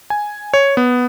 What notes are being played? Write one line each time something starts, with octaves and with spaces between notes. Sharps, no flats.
G#5
C#5
B3